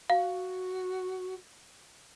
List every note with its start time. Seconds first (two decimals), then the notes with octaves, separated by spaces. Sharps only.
0.10 F#4 F5